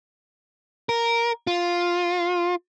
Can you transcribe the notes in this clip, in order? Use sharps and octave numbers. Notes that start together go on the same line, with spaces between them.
A#4
F4